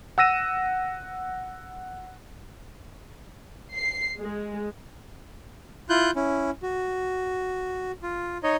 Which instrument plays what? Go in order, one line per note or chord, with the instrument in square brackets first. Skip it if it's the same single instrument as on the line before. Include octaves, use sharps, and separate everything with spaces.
[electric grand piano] F#5 E6 A#6 D#7 E7
[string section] C7
G#3
[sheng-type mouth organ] E4 F4 F#6 G6
C#4 E4
F#4
F4
D#4 C#5 D#5